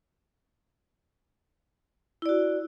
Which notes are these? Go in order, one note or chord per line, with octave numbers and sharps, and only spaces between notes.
E4 F#4 D5